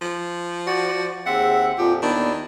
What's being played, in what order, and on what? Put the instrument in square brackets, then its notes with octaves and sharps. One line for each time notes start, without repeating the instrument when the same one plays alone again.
[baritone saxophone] F3
[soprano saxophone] F#4 [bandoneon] D5
[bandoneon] D#2 C4 E5 [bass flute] G#4 [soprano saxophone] F#5
[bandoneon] F2 A#2 F3 [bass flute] F4 [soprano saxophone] G4
[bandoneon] D#2 E4 A5 [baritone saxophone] D#3 [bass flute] B3 [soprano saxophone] D4